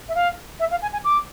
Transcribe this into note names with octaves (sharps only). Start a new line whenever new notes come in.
E5
F5
E5
F5
G#5
G#5
D6